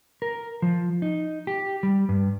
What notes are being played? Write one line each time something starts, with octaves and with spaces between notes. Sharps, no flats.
A#4
F3
D#4
G4
G3
G2